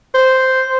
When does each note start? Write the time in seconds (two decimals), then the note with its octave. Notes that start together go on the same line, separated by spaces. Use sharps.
0.14 C5